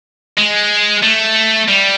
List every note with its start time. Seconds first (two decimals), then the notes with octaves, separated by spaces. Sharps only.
0.38 G#3
1.03 A3
1.68 G3